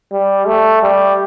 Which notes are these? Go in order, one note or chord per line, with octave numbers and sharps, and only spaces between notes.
G3
A3
G3